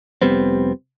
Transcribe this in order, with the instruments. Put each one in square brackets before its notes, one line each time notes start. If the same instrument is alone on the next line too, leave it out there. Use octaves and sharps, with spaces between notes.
[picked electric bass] F1 G3 B3 C4